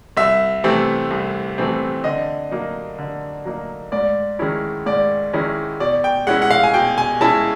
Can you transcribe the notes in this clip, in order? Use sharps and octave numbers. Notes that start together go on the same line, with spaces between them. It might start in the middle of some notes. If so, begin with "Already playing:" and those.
C2 E5
C3 E3 A3 C4
C2
C3 E3 A3 C4
D3 D#5
F#3 A#3 D#4
D3
F#3 A#3 D#4
G#2 D5
D#3 G#3 C#4 E4
G#2 D5
D#3 G#3 C#4 E4
B2 D5
G5
G#3 C#4 E4 F#5
F#5
F5
G#5
B2 G5
G#5
G#3 C#4 E4 A5